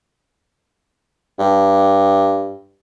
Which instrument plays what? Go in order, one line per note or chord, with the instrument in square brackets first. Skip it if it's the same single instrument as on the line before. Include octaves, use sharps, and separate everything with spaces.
[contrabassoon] G2